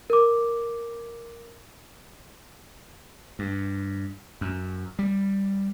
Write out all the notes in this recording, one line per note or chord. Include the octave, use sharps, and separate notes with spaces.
A#4 D6
G2
F#2
G3